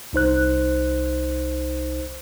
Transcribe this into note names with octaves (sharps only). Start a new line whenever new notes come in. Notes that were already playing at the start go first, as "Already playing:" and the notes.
C2 D#4 C5 F#6